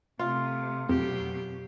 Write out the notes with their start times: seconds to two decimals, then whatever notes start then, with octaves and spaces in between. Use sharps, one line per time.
0.19 C3 A3 F4
0.89 F2 B2 F#3 G4